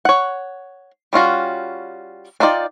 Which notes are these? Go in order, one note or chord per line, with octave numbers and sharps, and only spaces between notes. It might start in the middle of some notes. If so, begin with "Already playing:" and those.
C#5 F#5
G3 C#4 F4 F#4
D4 D#4 F4 D5 G5